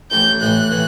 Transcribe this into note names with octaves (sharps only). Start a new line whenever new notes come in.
A1 A2 E3 G6
A1 A2 E3 F#6
A2 E3